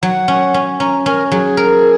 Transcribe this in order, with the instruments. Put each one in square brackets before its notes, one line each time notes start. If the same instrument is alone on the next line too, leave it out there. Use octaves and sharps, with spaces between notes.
[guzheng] F#3 [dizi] F#5
[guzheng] C#4
C#4
[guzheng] C#4 [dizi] A#5
[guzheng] C#4 [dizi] A#4
[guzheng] F#3 [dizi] G#4
[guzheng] A#4